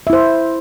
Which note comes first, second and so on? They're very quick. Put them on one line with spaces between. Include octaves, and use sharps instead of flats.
E5 E4 C5